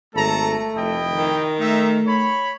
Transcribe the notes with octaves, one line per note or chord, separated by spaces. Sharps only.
G#1 A3 A4 A5 A#5
F1 E4 D#5 G5
D#3
A3 D#4 E5
C#5 B5